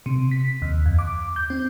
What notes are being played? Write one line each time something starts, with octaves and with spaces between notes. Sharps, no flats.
C3
B6
D#2
F2
D6
G6
C4